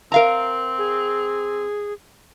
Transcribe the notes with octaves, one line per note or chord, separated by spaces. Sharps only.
C4 A#4 F5 A#5
G#4